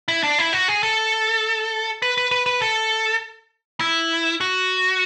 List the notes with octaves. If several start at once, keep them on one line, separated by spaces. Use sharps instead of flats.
E4
D4
E4
F#4
G#4
A4
B4
B4
B4
B4
A4
E4
F#4